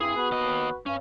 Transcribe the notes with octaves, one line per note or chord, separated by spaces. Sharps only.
G2 C4 E4 G#4
B3 F#4 B4
D#2 D#5
G2 C#4